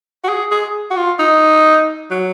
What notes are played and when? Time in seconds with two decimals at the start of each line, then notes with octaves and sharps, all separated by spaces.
0.24 F#4
0.29 G#4
0.51 G#4
0.90 F#4
0.97 F4
1.19 D#4
2.11 F#3